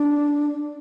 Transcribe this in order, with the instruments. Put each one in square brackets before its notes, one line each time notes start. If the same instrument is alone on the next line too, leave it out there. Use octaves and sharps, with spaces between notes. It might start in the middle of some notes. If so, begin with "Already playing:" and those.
Already playing: [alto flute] D4